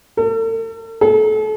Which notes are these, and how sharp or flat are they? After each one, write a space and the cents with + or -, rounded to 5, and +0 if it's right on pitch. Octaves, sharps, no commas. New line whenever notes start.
A4 +45
A4 -35